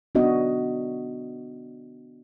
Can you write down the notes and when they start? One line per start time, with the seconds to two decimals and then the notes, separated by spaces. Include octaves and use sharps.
0.15 B3 D4 F#4 D#5